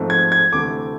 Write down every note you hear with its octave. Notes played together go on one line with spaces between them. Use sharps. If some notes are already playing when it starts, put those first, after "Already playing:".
Already playing: G#2 F3 A3 C4
G#6
G#6
D2 C3 E3 A3 D6